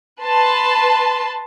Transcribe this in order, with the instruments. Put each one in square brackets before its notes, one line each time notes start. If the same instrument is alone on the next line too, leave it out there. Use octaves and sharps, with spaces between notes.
[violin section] B4 A5 C6